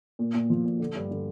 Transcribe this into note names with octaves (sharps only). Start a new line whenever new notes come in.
A#2
A#2
F3
A#2
D3
G2
D3